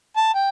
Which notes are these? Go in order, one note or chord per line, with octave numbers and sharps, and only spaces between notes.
A5
G5